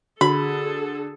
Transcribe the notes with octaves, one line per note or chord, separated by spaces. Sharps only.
D3 F#4 G#4 A4 B5